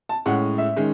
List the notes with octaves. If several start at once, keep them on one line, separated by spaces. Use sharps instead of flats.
A5
A2 G#3 C#4 F#5
E5
D#3 G#3 C#4